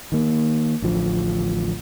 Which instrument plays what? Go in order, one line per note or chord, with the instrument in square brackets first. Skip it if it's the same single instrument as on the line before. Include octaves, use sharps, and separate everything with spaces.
[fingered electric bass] D#3 A#3
A1 D2 F3